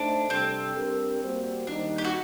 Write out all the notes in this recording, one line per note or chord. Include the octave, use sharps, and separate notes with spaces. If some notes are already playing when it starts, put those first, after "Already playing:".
Already playing: A3 D4 D#4 A4 C5
C3 G3 C4 D4 A4
G3 D4 G4 A#4
G3 A#3 F#4 C5
D#3 G3 A#3 D4 D#4
G4
F#4